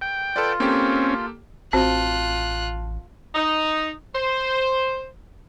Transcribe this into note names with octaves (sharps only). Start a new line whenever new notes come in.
G5
F4 A4 B4 D5
A#3 C4 C#4 G4 A4
A1 C4 F4 F#4 C5 A5 F#6
D#4
C5